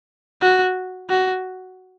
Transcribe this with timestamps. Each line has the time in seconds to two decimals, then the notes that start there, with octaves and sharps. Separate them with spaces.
0.42 F#4
1.09 F#4